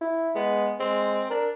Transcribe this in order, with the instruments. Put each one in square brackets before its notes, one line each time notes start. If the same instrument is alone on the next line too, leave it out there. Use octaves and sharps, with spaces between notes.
[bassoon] E4
[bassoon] G#3 [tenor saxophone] B3
[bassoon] G#3 [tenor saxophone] C4
[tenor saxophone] D4 [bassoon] A#4